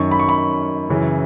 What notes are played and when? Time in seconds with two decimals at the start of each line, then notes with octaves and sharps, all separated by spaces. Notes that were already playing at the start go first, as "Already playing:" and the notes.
Already playing: F#2 D#3 C#6
0.11 B5
0.19 C#6
0.29 B5
0.89 F#2 C#3 E3